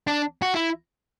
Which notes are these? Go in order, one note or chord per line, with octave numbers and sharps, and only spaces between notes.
D4
F#4
E4